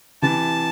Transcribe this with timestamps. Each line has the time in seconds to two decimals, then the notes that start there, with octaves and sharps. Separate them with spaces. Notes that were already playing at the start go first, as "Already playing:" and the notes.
0.22 C3 E3 A5